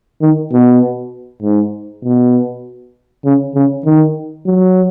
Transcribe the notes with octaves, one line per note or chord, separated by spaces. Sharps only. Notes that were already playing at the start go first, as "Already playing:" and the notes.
D#3
B2
G#2
B2
C#3
C#3
D#3
F#3